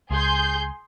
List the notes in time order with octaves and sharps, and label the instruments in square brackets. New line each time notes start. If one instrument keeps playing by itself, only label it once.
[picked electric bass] C#2 [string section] G#4 C6 G6